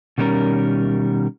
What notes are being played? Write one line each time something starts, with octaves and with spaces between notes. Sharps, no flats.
B2 D#3 G3 C#4 A#4